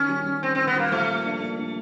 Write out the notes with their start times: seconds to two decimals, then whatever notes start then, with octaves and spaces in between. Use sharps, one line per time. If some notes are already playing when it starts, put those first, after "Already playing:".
Already playing: D#3 C#4
0.09 G3
0.26 G3
0.43 D#3 C4
0.55 D#3 C4
0.67 B3
0.76 G3 A#3
0.92 F3 A3
1.09 A#3
1.26 D4
1.41 A#3
1.59 D4